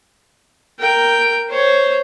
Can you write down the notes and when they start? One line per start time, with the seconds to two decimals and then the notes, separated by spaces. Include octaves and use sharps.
0.79 A#4 G5
1.49 C5 C#5